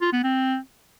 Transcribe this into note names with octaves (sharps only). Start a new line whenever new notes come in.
F4
B3
C4